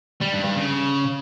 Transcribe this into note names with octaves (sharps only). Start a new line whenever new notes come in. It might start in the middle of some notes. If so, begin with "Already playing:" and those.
G3
G2
G2
C#3